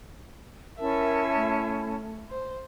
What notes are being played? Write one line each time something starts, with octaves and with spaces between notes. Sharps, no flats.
C#4 E4 A#4 E5 A5
A3
C5